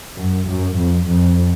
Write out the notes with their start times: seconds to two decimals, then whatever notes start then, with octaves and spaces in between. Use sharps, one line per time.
0.16 F#2
0.47 F#2
0.76 F2
1.07 F2